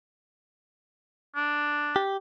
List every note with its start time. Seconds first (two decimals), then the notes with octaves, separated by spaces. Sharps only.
1.35 D4
1.96 G4